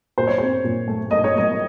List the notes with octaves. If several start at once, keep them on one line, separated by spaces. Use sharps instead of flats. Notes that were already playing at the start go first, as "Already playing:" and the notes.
A#2 C5
C#5
C4 C5
A#2
A3
A3 D#5
C#5
A3 D#5